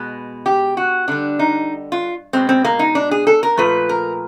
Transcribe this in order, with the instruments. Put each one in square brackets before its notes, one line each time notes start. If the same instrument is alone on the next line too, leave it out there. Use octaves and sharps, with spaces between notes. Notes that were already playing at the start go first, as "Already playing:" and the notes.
Already playing: [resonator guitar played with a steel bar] B2 G#3
G4
F#4
D3 G3 D4
D#4
F4
B2 G#3 C4
C4
A#3
D#4
D4
G#4
A4
A#4
A#2 F3 A3 B4
A#4